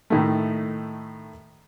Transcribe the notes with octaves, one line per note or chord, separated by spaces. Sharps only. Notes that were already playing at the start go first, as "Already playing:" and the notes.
A2 D#3 A3